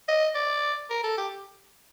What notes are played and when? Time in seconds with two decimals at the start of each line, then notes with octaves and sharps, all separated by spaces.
0.08 D#5
0.35 D5
0.90 A#4
1.03 A4
1.18 G4